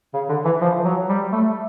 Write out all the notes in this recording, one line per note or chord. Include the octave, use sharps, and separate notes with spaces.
C#3
D3
E3
F3
F#3
G3
A3